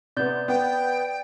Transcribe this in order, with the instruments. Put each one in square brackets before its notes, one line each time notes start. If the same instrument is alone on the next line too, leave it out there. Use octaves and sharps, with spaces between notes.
[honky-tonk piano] C3 B3 [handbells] D5 G6
[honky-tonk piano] B3 [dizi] G5